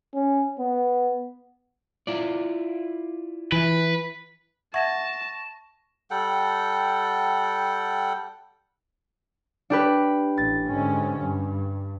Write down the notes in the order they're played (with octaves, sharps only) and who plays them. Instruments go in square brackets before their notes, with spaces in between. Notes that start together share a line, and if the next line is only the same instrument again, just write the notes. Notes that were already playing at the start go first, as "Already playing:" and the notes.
[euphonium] C#4
B3
[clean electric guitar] E4 F4 D5
[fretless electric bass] E3 [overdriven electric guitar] B4
[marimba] E5 F#5 G#6 [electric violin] A5 [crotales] C#6 A#6 E7
[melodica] G3 A4 F#5 G5
[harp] D4 G4 B4
[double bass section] A1 [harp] A6
[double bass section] G#2 D3 C#4
G2